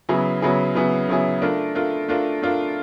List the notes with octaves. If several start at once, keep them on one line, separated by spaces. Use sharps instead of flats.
C#3 F#3 B3 E4 G#4
C#3 F#3 B3 E4 G#4
C#3 F#3 B3 E4 G#4
C#3 F#3 B3 E4 G#4
A3 D4 F4 A#4
A3 D4 F4 A#4
A3 D4 F4 A#4
A3 D4 F4 A#4